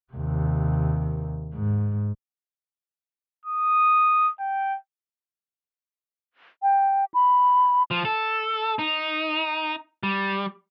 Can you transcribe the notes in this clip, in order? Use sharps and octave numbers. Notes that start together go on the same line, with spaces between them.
D#2 C3
G#2
D#6
G5
G5
B5
F3
A4
D#4
G3